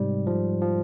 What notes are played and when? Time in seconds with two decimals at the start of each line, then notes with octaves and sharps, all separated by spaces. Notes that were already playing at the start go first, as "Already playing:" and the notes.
Already playing: G#2 C3 G3
0.27 F3
0.62 F3